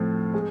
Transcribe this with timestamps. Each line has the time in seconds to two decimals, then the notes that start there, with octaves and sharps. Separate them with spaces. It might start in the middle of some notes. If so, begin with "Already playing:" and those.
Already playing: A2 F3 A3 C4
0.34 G#3